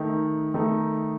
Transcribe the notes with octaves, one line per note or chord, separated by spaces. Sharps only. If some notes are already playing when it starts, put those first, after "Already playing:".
Already playing: D#3 A3 D#4
D#3 A3 D#4